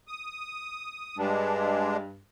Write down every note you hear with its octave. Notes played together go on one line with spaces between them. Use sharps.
D#6
G2 G#3 D4